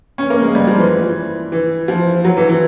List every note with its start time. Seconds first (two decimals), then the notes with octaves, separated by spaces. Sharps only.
0.18 C#4
0.30 A#3
0.42 G#3
0.55 G3
0.67 F3
0.79 E3
1.52 E3
1.88 F3
2.25 F#3
2.37 E3
2.49 E3